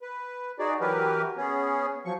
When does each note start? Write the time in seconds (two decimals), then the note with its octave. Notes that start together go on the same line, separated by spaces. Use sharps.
0.02 B4
0.59 D#4 F#4 G#4 D5
0.81 E3 F#3 G4 A#4 B4
1.37 B3 C#4 G#4
2.05 F3 F#3 C#6